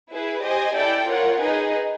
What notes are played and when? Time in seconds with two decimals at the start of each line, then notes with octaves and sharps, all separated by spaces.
0.11 E4 G#4 B4
0.43 G4 C5 D#5 G#5
0.76 E4 A4 D5 G5
1.08 F4 A#4 C#5 F#5
1.40 D#4 G#4 B4 D#5